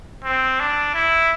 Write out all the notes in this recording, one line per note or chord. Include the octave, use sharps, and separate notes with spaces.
C4
D4
E4